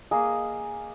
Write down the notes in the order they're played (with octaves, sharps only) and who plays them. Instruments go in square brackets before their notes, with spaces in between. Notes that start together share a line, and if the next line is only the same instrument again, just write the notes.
[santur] A#3 G#4 D#5